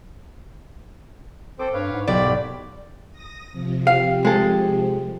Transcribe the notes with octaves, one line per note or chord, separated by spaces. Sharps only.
C4 A4 C5 D6
G2 B4 C#5 F5
G#2
B1 G4 D5 B5
D#6 A#6
C3 F3
G4 F5
G#3 A4